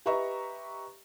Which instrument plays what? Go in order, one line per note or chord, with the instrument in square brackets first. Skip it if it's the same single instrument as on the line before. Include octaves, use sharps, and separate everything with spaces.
[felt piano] G4 B4 D#5 E5 A#5 C#6